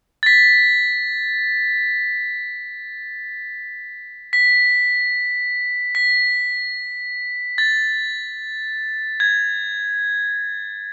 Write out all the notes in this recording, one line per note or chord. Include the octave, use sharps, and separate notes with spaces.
A6
B6
B6
B6
A6
G#6